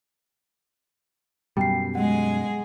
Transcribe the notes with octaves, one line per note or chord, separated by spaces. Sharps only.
F#2 B2 G3 G5 C7
G#3 G#4 F#5